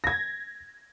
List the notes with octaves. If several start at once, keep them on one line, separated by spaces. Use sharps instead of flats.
G#6 A#6